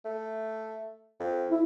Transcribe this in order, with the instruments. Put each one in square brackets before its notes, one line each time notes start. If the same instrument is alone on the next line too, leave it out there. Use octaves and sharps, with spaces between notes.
[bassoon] A3
F2
[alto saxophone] E4